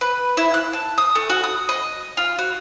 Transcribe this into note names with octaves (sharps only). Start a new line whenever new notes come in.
B4
E4
F#6
A5
D#6
A3
F#4
D#6
D#5
F4
F#4